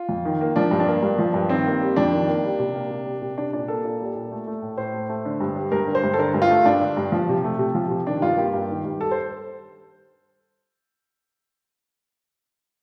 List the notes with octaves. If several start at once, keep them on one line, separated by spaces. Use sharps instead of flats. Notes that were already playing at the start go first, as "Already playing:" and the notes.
Already playing: F4
F2
D#3
A#3
F3 D4
G2
D4
A#3
G2
F3
G2
D#3 C4
A#3
G3
F2 D4
D#3
A#3
G3
C3
A#3
C3
G3
C3
G3 D4
A#2 D4
A#3 A4
A#2
G3
A#2
A3
A3
A2
A2 C5
A3
A3
D3
G2
G3
G2 A#4
D3
C5
G2
A4
D3 A#4
G2
F4
A3
G2 D4
D3
G2
F3
C3
A3
C3
F3
C3
D#3 D4
G2 F4
A#3 G4
G2
D#3
G2
G3 A4
C5